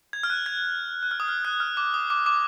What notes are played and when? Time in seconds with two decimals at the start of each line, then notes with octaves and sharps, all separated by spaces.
0.13 G#6
0.23 F6
0.30 F#6
0.46 G#6
1.03 F#6
1.11 F6
1.20 D#6
1.28 F6
1.45 F#6
1.60 F6
1.77 D6
1.94 D#6
2.10 D6
2.26 D6